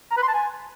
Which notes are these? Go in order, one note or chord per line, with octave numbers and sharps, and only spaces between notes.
A#5
B4
C6
A5
G#5